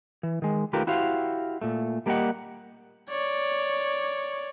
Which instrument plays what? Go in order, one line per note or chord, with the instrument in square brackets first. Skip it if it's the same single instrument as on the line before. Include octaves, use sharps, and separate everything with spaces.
[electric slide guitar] E3
D#3 G#3
D#3 A3 F4 G4 A#4 B4
E4 F#4 G4 C5 F5
A#2 A3
G3 A#3 G4 G#4 D#5 F#5
[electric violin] C#5 D5